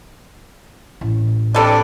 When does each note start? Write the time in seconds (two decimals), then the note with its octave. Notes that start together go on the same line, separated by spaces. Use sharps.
1.01 A1
1.55 G3 C4 D4 A4 D5 D#5